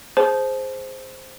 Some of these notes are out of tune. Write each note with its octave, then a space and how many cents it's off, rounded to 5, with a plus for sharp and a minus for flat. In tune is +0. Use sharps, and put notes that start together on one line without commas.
G#4 +0 C5 +0 A5 -30